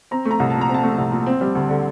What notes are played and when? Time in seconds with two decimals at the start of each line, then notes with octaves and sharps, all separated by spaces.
0.11 C4 A#5
0.25 A3
0.31 A#5
0.40 C2
0.50 A#2 A5
0.61 A#5
0.69 C4
0.74 A5
0.83 A3
0.98 C2
1.12 A#2
1.26 C4
1.41 G3
1.55 D2
1.69 D3